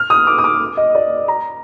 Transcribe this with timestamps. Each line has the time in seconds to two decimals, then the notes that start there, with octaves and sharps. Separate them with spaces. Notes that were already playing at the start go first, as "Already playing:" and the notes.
Already playing: F6
0.10 D#6
0.27 D6
0.38 D#6
0.44 D6
0.77 D#5
0.95 D5
1.28 A#5